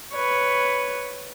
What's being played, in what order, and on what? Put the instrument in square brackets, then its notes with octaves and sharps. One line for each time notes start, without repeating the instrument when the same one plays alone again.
[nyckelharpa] B4 C#5